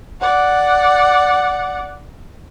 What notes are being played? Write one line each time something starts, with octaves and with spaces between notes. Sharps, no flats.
D5 F#5